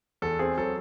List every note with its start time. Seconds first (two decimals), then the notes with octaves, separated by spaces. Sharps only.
0.22 E2 A4
0.39 C4 G#4
0.58 F#3 A4